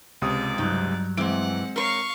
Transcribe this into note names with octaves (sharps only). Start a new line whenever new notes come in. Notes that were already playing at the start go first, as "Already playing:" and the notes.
C#2 C3 D5 D#6
G2 F#3 D#4
C3 E3 G#3 C4 F#5 D7
A#4 B4 C#5 F5 C#6